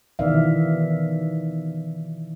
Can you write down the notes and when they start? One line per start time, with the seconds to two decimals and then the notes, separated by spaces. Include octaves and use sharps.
0.19 B2 D#3 E3 D5 E5 F5